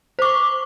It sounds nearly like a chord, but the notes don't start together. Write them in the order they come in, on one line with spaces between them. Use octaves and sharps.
C5 D6 C#6